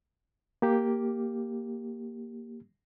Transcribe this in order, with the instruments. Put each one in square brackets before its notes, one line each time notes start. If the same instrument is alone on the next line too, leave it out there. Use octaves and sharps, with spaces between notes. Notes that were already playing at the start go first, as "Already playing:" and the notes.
[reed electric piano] A#3 G4